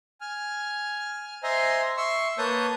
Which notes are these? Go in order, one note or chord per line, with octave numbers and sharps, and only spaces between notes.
G#5 F6
C5 D#5 E5 G#5 A#5 C6
E5 C6 C#6 E6
A#3 B4 C#5 A5 D#6 G6